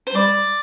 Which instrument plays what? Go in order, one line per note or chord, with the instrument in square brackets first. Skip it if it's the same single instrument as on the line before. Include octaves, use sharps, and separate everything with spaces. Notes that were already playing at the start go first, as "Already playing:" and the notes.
[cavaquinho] C5
[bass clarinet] G3 [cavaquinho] D5